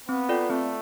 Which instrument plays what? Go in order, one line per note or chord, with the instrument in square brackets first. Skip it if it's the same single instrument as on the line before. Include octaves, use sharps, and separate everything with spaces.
[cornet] B3 [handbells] C4
[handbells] F4 A4 D5 G5
[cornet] A3 [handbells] C4